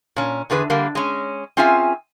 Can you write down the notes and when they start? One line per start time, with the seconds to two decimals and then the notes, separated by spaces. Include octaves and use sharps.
0.16 A#2 C#4
0.50 E2 D3 G#4 B4
0.70 D3 G3 A#3
0.95 G#3 C#4
1.57 C4 C#4 F4 G#4 E5 G#5